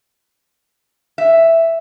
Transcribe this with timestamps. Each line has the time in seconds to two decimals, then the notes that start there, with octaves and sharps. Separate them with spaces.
1.18 E5